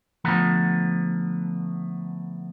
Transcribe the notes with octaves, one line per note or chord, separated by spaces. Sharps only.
D3 F3 A3 B3 F#5 A#5